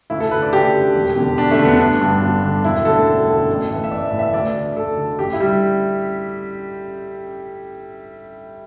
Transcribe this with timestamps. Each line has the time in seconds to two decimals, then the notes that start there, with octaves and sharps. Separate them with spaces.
0.10 D2 E4
0.20 A4
0.31 D3 B4
0.42 D5
0.52 D2 G4
0.74 D3
0.95 E1
1.16 E2 D3
1.37 E1 D4
1.51 A3
1.59 E2 D3
1.65 B3
1.79 G1 D4
2.01 G2 D3
2.22 G1
2.43 G2 D3
2.64 E1 E4
2.85 D2 D3 A4
3.07 E1
3.27 D2 D3
3.48 A1
3.70 A2 E3
3.84 E5
3.91 A1 D5
4.05 E5
4.12 A2
4.17 E3 E5
4.33 D2 D5
4.55 D3
4.76 D2 A4
4.97 D3
5.19 A1 G4
5.33 E4
5.40 G3
5.43 D3